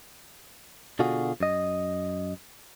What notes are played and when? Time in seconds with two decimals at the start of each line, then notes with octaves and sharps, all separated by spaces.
0.99 B2 D3 F4 F#4 G#4
1.40 F#2 D#5